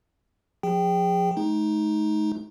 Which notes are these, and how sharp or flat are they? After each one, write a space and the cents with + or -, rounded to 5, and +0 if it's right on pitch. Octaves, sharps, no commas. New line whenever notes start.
F3 +40 G#4 -30 G5 -5
A3 -45 D#4 +10